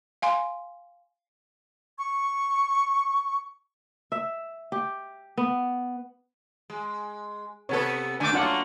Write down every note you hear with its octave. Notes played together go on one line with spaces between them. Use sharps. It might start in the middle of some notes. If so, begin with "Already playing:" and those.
F5 G#5 C6
C#6
E5
G4
B3
G#3
C3 B3 A4 B4 C#5
D3 A3 D4 G#5 D6
F#3 A3 A#3 D4 F4 F#5